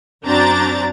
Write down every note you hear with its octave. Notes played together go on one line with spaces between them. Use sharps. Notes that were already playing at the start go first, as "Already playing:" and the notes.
F#2 C4 D4 F#4 A#5 A6